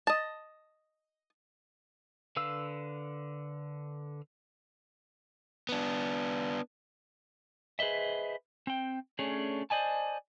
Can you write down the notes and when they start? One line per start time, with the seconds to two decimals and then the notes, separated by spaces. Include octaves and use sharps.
0.07 D#5 A5
2.36 D3 B4 F5 E6
5.69 B3 D4
7.79 G#4 B4 C5 D#5 E5
8.67 C4 G5
9.19 A3 C#4 D4 G#4 C#5
9.70 C5 D5 D#5 G#5 A5